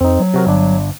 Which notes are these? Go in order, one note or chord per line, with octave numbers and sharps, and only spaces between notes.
F2 C4 D#4
F#3
C3 F#4 A#4
G1 D4